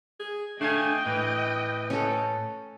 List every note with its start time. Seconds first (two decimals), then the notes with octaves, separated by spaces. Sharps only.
0.20 G#4
0.61 A3 D4 D#5 F5 G5 G#5
1.06 A2 E3
1.90 C#4 A4